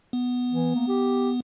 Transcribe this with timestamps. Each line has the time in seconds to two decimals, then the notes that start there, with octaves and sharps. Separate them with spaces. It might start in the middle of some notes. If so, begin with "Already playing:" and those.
0.13 B3
0.52 E3
0.75 A#3
0.88 G4